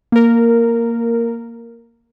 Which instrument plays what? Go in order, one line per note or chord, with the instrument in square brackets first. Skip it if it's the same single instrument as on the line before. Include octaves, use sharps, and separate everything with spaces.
[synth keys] A#3 A#4